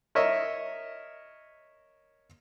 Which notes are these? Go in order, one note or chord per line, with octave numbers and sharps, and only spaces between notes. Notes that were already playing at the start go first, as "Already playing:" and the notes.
A#4 C#5 D#5 E5